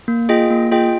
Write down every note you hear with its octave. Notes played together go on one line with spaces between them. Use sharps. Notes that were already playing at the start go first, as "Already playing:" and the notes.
A#3
F4 G#4 D#5 G5
A#3
F4 G#4 D#5 G5